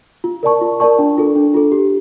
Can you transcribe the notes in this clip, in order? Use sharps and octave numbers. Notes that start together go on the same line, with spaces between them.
F4
A#4 D5 A5 C#6
F4
A#4 D5 A5 C#6
D4
F4 A4
D4
F4 A4
G4